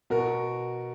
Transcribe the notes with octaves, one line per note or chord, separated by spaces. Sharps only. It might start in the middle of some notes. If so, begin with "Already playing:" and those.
B2 F#4 A#4